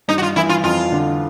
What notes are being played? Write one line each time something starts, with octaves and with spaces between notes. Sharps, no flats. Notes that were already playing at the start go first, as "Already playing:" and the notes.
G2 D#4
F#4
F4
E3 E4
F4
F2 F4
D3